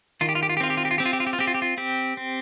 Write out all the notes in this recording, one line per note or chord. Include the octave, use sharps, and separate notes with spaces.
D#3 F4
G4
F4
G4
F4
G4
C4 F4
G4
F4
G4
F4
C4 G4
F4
G4
F4
G4
F4
C4 G4
F4
G4
F4
C4 G4
C4